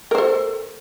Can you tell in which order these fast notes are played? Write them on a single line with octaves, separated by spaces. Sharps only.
A#4 C5 A4